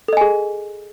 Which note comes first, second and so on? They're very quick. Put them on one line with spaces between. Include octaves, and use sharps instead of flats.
A4 D#5 G#5 G#4